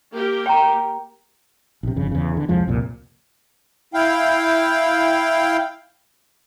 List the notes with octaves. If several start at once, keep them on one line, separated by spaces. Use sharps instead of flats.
A#3 G4 A#4
G5 A#5
A#1 C3
G1 F2 C#3
E2 C#3
D3
C2 F2 F3 G#3
C2 F2 A#2
E4 F5 G5